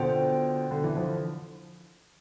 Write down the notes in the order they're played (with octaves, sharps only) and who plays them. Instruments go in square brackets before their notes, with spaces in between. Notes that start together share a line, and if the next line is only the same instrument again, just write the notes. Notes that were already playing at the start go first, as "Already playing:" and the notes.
Already playing: [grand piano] B2 D3 [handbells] F4 C5 G5
[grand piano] D3
E3
D3 F3